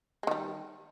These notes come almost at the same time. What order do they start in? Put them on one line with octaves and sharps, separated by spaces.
G#3 D#3 G3